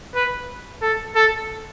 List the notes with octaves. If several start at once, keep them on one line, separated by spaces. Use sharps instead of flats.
B4
A4
A4